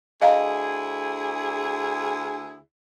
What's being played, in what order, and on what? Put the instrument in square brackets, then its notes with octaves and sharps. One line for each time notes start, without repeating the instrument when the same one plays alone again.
[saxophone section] D2 E4 G#4 [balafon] D#5 F5 A#5